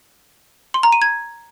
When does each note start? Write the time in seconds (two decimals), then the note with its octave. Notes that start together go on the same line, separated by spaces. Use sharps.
0.74 C6
0.83 A#5
0.92 D#7
1.02 G#6